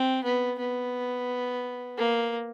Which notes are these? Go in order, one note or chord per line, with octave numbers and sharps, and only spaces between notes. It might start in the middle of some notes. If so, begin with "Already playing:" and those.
Already playing: C4
B3
B3
A#3